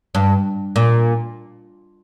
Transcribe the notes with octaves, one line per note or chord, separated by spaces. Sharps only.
G2
A#2